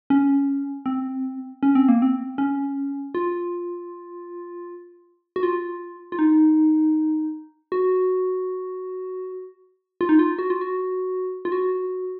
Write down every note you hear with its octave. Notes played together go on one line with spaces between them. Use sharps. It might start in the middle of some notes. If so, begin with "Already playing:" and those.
C#4
C4
C#4
C4
A#3
C4
C#4
F4
F#4
F4
F4
D#4
F#4
F4
D#4
F4
F#4
F4
F#4
F4
F#4